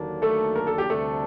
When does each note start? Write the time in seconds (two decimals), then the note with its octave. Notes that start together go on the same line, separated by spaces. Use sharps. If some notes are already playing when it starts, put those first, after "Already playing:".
Already playing: D#2 D3 F#3 A#3 D4
0.22 A3 A4
0.56 A#4
0.67 A4
0.78 G4
0.88 D2 C3 G3 A3 D4 A4